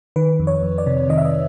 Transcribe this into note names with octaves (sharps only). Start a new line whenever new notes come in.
D#3 B4
F2
C#5
F2
D5
C3
D#3 D#5
E5
D#5